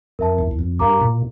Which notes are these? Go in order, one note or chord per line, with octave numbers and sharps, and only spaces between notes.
F2 A#4 E5 A5
E2
E2
F2
G2 A#4 F5 A#5 D6
A#2